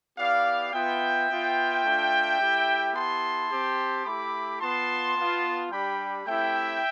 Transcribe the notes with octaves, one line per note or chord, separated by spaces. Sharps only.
B3 E4 G4 D5 F5
B3 F4 E5 G5
B3 F4
A3 D4 F4
A3 E4 G4
B3 E4 G4 A5 C6
C4 G4
A3 E4 G4 B5 D6
B3 F4 A5 C6
B3 F4
G3 D4 G4 G5 B5
A3 C4 E4 G4 E5 G5